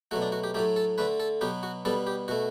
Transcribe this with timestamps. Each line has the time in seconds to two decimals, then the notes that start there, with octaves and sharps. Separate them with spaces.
0.11 B2 F#3 A3 F#4
0.22 D4
0.32 F#4
0.44 G4
0.54 A2 F#3 A3 G4
0.76 A4
0.98 D3 A3 B4
1.20 A4
1.41 B2 F#3 B3 G4
1.63 F#4
1.85 B2 G3 B3 A4
2.07 G4
2.28 B2 A3 F#4